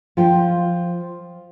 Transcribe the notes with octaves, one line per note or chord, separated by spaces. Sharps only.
F3 F4 G5